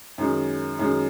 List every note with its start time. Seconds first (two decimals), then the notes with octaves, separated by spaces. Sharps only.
0.18 F#2 D#3 G#3
0.79 F#2 D#3 G#3